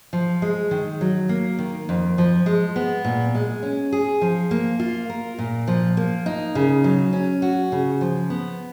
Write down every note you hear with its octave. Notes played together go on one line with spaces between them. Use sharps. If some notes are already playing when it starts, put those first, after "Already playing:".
F3
G#3
D#3
F#3
A#3
D#3
F2
F3
G#3
B3
A#2
G#3
C#4
G#4
F3
A#3
F4
A#4
A#2
F3
A#3
D#4
C#3
F#3
C#4
F#4
C#3
F3
B3